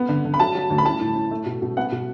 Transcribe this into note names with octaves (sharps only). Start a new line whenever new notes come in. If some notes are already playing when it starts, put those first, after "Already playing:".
Already playing: B3
D3
D3
B5
F#3 A5
F#3
D2
B5
A2 A5
A2
A2
A3
B2
B2
B3 F#5
B2